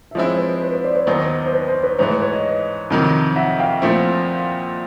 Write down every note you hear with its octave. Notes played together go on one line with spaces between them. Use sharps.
E5
F3 G#3 C4 E4 C#5 D#5
B4
B4 C#5
B4 C#5
C5 D5
B4 C#5
D#2 D#3 F#3 B3 D#4 C5
C5
B4
C5
B4 C#5
G#2 E3 A3 B4 C#5
B4 C#5
C#5 D#5
F2 C3 D#3 F#3
E5 F#5
F5 G5
A#2 F3 A3 C4 E4